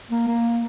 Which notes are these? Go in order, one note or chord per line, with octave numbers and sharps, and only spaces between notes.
A#3
A#3